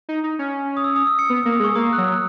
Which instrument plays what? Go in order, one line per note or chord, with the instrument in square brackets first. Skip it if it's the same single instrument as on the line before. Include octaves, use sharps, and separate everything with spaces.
[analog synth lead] D#4
D#4
C#4
[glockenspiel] D#6
E6
D#6
E6
C#7
[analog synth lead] B3 [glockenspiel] E6
[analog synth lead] A#3 [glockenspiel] E6
[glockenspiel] D#6
[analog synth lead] G#3 [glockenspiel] C#6
[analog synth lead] A#3 [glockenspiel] D#6
[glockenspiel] F#6
[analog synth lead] F#3 [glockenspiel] E6